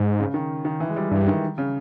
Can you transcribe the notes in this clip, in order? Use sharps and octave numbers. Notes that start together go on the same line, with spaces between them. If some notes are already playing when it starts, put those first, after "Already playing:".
Already playing: G#2
C#3
D#3
D#3
E3
G#3
G3
G2 E3
D#3
C#3